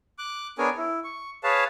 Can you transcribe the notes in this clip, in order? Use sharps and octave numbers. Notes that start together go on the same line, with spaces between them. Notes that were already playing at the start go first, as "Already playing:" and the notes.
D6 F#6
B3 D4 G#4 A#4 C#5 G#5
E4
C#6
G#4 B4 C#5 F5 A5